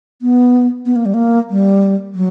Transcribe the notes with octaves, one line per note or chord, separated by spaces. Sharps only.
B3
B3
A#3
G3
A#3
G3
F#3